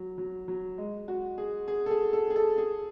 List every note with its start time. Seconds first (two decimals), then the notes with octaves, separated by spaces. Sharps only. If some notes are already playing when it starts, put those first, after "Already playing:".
Already playing: F#3
0.18 F#3
0.48 F#3
0.78 G#3
1.08 F#4
1.38 G#4
1.68 G#4
1.86 A4
1.91 G#4
2.13 A4
2.30 G#4
2.36 A4
2.58 G#4